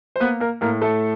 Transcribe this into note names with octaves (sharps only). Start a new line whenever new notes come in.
C5
A#3 B3 B4
A#3 A#4
A2 A#3 A#4
A3 A4